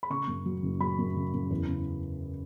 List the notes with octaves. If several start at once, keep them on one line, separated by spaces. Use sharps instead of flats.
B5
C#3 C#6
F#2
F#3
F#1
F#3 B5
F#2
C#3
F#2
E2
C#3